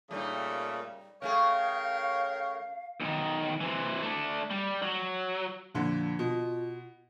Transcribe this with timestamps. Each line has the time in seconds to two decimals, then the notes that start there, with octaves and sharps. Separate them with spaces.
0.11 A#2 C#3 G3 A3 D#4
1.22 C#3 A3 G#4 A#4 C#5 F5 G5
3.00 B1 D#3
3.61 C3 E3
4.02 A3 D4
4.51 G3
4.82 F#3
5.75 F2 A#2 D3
6.19 B2 F4